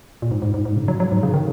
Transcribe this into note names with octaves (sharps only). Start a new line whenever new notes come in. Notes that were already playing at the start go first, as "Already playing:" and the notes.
A#2
G#2
G#2
G#2
G#2
C#3
F#3
F#3
G#2
C#3
D#3